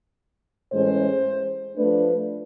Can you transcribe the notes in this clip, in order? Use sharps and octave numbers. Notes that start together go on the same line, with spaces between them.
A2 E3 G#3 C#4 C5
F3 A3 D4 B4